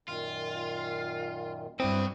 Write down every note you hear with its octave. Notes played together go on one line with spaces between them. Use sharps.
F#2 A#2 D#3 F4
G2 F#3 C4 E4 D#5